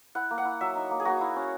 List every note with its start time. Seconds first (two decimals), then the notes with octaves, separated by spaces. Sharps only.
0.15 E4 F#5
0.31 A#3
0.38 F#5
0.45 E4
0.61 F#3 E5
0.75 D#4
0.91 A#3
1.00 G#4
1.05 A#3 F#4
1.21 E4
1.36 C#4